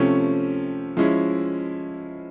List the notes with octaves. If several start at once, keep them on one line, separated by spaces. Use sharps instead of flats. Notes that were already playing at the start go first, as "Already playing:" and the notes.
Already playing: C3 F3 A3 C#4
F3 G#3 C#4 E4